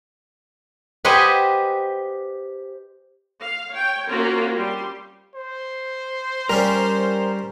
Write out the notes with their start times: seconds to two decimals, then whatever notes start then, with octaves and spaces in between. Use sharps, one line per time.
1.05 G4 B4 C5 D#5 F#5 G#5
3.39 F5
3.71 C#5 G5
4.08 A#3 C4 C#4 F4 F#4 A#4
4.56 G3 C6
5.34 C5
6.49 G3 C#4 A#4